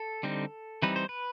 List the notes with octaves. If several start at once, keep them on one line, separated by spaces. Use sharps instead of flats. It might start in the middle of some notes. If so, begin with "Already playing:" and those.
Already playing: A4
D3 G3 C4 D#4
E3 G3 C4 D#4 B4
C5
B4